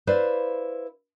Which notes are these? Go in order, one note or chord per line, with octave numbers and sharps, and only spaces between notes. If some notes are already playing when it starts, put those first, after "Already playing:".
E4 B4 C5 D5 F5